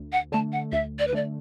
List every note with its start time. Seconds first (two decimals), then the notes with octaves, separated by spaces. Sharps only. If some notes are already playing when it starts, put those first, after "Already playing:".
Already playing: D2
0.12 F#5
0.32 D3 A3 A5
0.53 F#5
0.72 D2 E5
0.99 D5
1.07 B4
1.13 D3 A3 D5